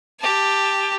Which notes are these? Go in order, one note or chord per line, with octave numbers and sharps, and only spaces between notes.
G4 A5